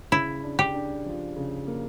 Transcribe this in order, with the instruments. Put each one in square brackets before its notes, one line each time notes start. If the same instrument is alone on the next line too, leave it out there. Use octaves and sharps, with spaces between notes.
[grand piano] C#3 [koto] E4
[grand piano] D4
[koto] G4
[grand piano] D4
F3
C#3
A#3